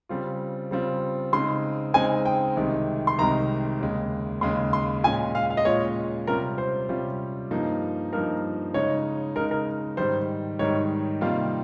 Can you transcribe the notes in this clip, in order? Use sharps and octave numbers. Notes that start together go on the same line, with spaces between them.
C#3 G3 C4 F4
C#3 G3 C4 F4
C#3 G#3 C4 D#4 C6
C#3 G#3 C4 D#4 G#5
G5
C2 C3 D#3 G#3
C6
C2 C3 D#3 G#3 A#5
D#2 C#3 G#3
D#2 C#3 G#3 C6
C6
A#2 G#3 C#4 F4 G#5
F5
F5
D#5
A#2 G#3 C#4 F4 C#5
C3 G3 C#4 F4 A#4
C5
C3 G3 C#4 F4
G2 F3 A#3 D#4
G2 F3 A#3 D#4 A#4
C#3 G#3 D#4 C#5
C#3 G#3 D#4 A#4
A#4
G#2 D#3 G3 C5
G#2 D#3 G3 C#5
C3 D#3 G3 A#3 F4 F5